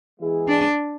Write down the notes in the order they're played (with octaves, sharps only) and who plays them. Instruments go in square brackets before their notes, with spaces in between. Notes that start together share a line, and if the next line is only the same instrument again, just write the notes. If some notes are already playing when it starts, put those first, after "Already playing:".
[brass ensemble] E3 G#3 B3 E4 G#4
[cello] D4